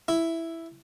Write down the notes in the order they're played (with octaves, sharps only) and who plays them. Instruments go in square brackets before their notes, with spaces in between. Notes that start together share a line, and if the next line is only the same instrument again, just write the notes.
[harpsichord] E4